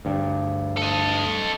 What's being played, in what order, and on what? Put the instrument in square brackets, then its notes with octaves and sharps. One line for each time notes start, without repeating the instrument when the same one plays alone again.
[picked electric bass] D2 G2
[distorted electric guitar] A4 D#5